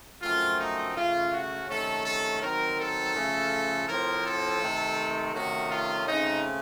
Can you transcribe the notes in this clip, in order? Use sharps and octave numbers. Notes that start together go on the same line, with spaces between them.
F#2 F3 A3 C4 F4
D#4
C#3 A3 C#4 F4
F#4
C3 D#3 A3 C#4 A4
A4
D#3 F#3 C4 A#4
A4
C#3 F3 A3 C#4
A2 F3 C4 A#4
A4
C3 D#3 A3 C4
C3 D#3 A3 C#4 F#4
F4
C#3 A3 C4 D#4